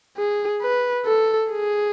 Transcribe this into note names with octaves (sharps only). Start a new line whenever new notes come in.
G#4
B4
A4
G#4